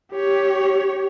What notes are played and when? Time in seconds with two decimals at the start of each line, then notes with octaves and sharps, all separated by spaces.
0.12 G4 C#5